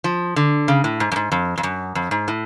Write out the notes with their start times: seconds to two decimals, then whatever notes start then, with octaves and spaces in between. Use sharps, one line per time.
0.04 F3
0.36 D3
0.68 C#3
0.84 A2
1.00 G#2
1.12 F#2
1.16 G#2
1.32 F2
1.58 F2
1.63 F#2
1.95 F2
2.11 G#2
2.28 A2